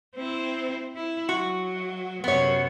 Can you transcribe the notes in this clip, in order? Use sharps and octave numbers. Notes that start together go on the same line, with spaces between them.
C4 E4
E4
F#3 F#4
F#2 C3 B3 C#5